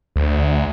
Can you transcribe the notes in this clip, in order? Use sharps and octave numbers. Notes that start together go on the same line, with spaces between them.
D2